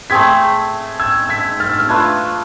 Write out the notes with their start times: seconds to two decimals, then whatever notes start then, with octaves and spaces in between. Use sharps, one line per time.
0.10 A3 C4 G#4 G#6 B6
1.00 E6 G#6
1.29 G#6 B6
1.60 F6 A6
1.69 E6
1.79 F6
1.89 A3 D4 F4 B4 E6 G#6